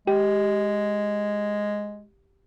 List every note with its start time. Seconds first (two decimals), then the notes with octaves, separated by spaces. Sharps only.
0.07 G#3 G4